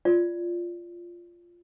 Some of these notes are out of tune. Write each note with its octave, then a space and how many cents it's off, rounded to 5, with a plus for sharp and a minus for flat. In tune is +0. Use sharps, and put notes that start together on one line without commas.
F4 -5 D5 +0